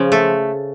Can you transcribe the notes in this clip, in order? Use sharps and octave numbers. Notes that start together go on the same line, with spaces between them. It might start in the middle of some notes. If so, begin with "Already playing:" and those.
Already playing: C#3 F3
A3